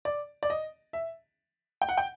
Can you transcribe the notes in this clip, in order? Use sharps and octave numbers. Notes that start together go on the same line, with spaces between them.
D5
D5
D#5
E5
G5
F#5
G5